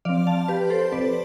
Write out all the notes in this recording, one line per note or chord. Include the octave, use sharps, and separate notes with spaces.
F3 C4 D5 F5
F5 A5
G4 B4
A4 C5
F3 C4 B4 D5